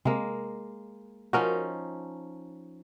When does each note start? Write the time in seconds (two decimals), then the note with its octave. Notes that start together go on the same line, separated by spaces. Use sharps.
0.05 C3 G#3 A#3
1.33 F3 C#4 D#4 F#4 A#4